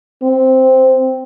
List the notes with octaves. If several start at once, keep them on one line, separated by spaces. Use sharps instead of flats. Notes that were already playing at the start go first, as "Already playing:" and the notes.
C4